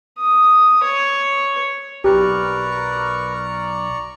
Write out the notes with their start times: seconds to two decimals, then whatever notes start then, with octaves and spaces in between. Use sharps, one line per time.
0.19 D#6
0.83 C#5
2.04 B1 G4 A#4 B4 D5 A#5 C#6